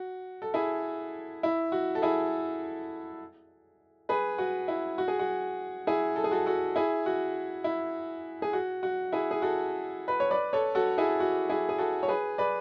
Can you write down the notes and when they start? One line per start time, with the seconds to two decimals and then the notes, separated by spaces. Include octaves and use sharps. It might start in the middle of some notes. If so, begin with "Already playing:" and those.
Already playing: F#4
0.42 A4
0.54 E4 G#4
1.43 E4
1.72 F#4
1.95 A4
2.02 E4 G#4
4.09 G#4 B4
4.38 F#4
4.68 E4
4.98 F#4
5.08 G#4
5.19 F#4
5.87 E4 G#4
6.16 A4
6.24 G#4
6.31 F#4 A4
6.46 F#4 A4
6.76 E4 G#4
7.06 F#4
7.64 E4
8.42 G#4
8.53 F#4
8.83 F#4
9.12 E4 G#4
9.31 G#4
9.42 F#4 A4
10.08 B4
10.20 C#5
10.31 B4 D5
10.53 A4 C#5
10.75 F#4 A4
10.98 E4 G#4
11.20 F#4
11.49 E4 G#4
11.69 G#4
11.78 F#4 A4
12.03 C#5
12.08 G#4 B4
12.38 B4 D5